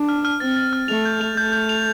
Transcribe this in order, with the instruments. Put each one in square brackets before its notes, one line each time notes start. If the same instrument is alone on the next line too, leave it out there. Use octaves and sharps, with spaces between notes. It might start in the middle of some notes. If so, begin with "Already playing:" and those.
Already playing: [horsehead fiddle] D4
[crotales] F6
F6
[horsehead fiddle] C4 [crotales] A6
[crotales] A6
F6
[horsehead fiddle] A3 [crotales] F7
[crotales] G6
F7
[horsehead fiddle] A3 [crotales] G6
[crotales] G6
F7